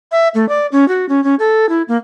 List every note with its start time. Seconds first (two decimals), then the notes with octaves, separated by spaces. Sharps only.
0.12 E5
0.35 A3
0.49 D5
0.72 C#4
0.88 F#4
1.09 C#4
1.24 C#4
1.39 A4
1.69 E4
1.88 A#3